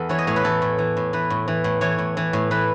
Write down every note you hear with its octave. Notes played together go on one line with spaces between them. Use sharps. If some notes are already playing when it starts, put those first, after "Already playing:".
Already playing: E2 A4 B4
E3 C#5
D#5
A2 C#5
B4
E3 A4
A2
E3
A2
E3 B4
A2
E3
A2
E3 C#5
A2
E3
A2
E3 B4